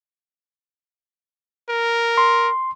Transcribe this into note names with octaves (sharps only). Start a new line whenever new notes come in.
A#4
C6